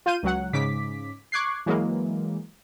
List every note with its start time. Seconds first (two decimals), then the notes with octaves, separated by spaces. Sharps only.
0.06 F4 F5 G6 D#7
0.23 C#2 F#3 F#5
0.53 G#2 C#3 D6 B6
1.32 C#6 D6 F#6 G#6 C7
1.66 E3 F#3 G#3 A#3